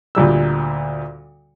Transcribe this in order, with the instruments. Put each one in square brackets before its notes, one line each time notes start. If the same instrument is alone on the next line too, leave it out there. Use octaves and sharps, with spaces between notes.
[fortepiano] D2 A#2 G3 E6